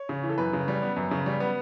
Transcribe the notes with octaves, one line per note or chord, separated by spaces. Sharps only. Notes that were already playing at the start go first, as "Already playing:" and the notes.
Already playing: C#5
C#3
E3
A4
F#2 B4
C#3
G3
B3
F#2
C#3
G3
B3